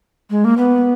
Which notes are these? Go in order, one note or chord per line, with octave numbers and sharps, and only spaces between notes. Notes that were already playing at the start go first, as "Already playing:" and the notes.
G#3
A#3
B3